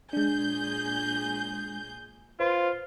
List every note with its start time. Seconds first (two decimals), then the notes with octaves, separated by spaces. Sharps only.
0.13 A#2 G#3 D4 G#4 G6
2.40 F4 B4 C5